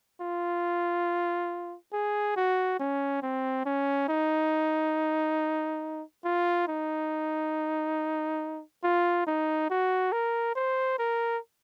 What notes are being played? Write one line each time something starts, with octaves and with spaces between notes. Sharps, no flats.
F4
G#4
F#4
C#4
C4
C#4
D#4
F4
D#4
F4
D#4
F#4
A#4
C5
A#4